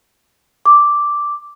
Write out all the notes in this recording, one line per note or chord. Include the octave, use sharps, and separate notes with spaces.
D6